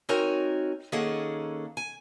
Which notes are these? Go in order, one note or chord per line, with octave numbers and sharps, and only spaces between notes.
C4 D#4 F#4 A#4 C#5 G#5
D#3 A#3 C#4 G#4 A4 F#5
G#5